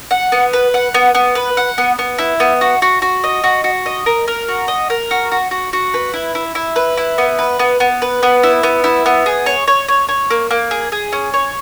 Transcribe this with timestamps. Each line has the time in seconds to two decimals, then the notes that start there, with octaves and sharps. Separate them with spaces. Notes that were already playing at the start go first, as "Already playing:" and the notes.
0.11 F#5
0.32 B3
0.53 B4
0.74 F#5
0.94 B3
1.15 B3
1.35 B4
1.57 F#5
1.78 B3
1.99 B3
2.18 E4
2.40 B3
2.61 F#4
2.82 F#4
3.02 F#4
3.24 D#5
3.44 F#4
3.64 F#4
3.86 D#5
4.06 A#4
4.28 A#4
4.48 F#4
4.68 D#5
4.90 A#4
5.11 F#4
5.32 F#4
5.51 F#4
5.73 F#4
5.94 B4
6.14 E4
6.35 E4
6.55 E4
6.76 B4
6.97 E4
7.18 B3
7.39 B4
7.59 B3
7.80 B3
8.02 B4
8.23 B3
8.43 E4
8.63 B3
8.84 E4
9.06 B3
9.26 G#4
9.46 C#5
9.67 C#5
9.88 C#5
10.09 C#5
10.30 A#3
10.51 A#3
10.71 G#4
10.92 G#4
11.13 C#4
11.34 C#5